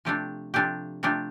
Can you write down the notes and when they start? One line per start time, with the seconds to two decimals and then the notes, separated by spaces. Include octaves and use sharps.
0.05 C3 F3 A3 D4 G4
0.54 C3 F3 A3 D4 G4
1.03 C3 F3 A3 D4 G4